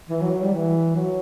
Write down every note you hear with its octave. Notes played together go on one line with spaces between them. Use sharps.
E3
F#3
F#3
G3
E3
F#3